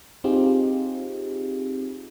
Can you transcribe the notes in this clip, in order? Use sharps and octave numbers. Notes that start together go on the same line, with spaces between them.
C4 D#4 F4 G4 G#4